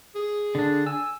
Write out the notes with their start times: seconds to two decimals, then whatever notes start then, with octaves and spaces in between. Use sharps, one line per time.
0.15 G#4
0.55 D3 D4
0.86 G#5 E6